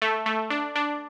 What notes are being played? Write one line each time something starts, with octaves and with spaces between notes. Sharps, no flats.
A3
A3
D4
D4